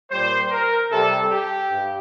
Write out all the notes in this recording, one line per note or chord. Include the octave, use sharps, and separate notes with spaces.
A#2 G3 C5
A#4
C3 G3 A4
G4
G2